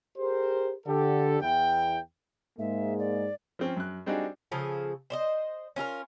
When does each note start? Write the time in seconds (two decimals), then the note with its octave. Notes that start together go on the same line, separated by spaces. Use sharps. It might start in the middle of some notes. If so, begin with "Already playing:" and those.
0.18 G4 G#4 A#4 C5
0.87 D3 G4 A4
1.41 E2 E4 G5
2.59 G#2 G#3 A#3 E5
2.99 D5
3.59 F3 C4 C#4
3.77 F#2 F#6
4.06 G3 C4 D4 D#4 F#4 G#4
4.52 C#3 F3 G#4 A4
5.10 C5 D5 D#5
5.76 C#4 F4 A4 A#4